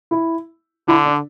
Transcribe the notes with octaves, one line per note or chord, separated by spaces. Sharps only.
E4
D3 E4
D4